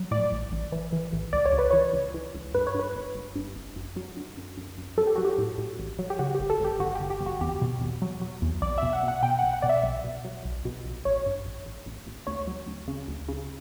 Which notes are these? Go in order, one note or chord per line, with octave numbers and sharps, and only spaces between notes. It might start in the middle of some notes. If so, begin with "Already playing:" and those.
Already playing: F#3
A2 D5
A1
A1
E3
E3
A1
C#2 D5
C#5
C#2
B4
E3 C#5
C#2
E3
C#2
G2 B4
C#5
G2 B4
G1
G1
G2
G1
F#2
F#3
D3
F#2
F#2
F#2
F#3 A4
G4
F#3 F#4
G4
A2
A2
A1
F#3
G4
C#3 F#4
G1 G4
A4
G1 G4
G1 F#4
G1 G4
G4
G1
F#4
E2 G4
B2
E2
F#3
F#3
E2
B1 D5
B2 E5
F#5
B2
F#5
B2 G5
B1 F#5
F#5
B2 D5
E5
B1
B2
F#3
B1
B2
B1
A1 C#5
G2
A1
A1
A1
A1
D2 C#5
F#3
D2
C#3
D2
C#3